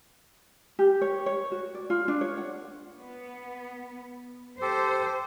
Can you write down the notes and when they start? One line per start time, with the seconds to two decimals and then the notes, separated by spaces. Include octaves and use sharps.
0.79 G4
1.01 C#5
1.26 C#5
1.52 F#4
1.75 D5
1.90 F4
2.08 D4
2.21 C#5
2.37 F#5
3.01 B3
4.62 G4 A4 C5